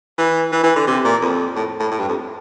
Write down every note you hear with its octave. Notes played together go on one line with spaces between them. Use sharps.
E3
E3
E3
D3
C3
A#2
F2
A2
A2
A2
G2
F2